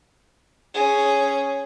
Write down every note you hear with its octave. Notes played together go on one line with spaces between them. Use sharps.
C#4 G#4